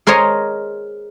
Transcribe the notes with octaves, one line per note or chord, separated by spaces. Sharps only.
G#4 A#4 C5 C#5 D#5 A#5